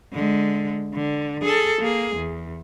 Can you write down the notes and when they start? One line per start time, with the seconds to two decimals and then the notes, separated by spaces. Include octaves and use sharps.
0.13 D3 G#3
0.94 D3
1.43 G#4 A4
1.81 A#3 G#4
2.16 E2